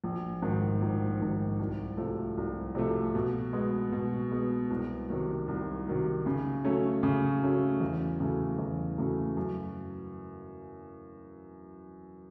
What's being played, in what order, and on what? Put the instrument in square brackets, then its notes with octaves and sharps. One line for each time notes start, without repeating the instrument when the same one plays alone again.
[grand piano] A#1
G#2 D#3
A#1
G#2 D#3
C2
C3 F3 A3
C2
C3 F3 A3
B2
G#3 B3
B2
G#3 B3
C2
C3 D#3 F#3
C2
C3 D#3 F#3
C#3
F#3 A3 C#4
C#3
F#3 A3 C#4
E2
C#3 F#3 A3
E2
C#3 F#3 A3
F#2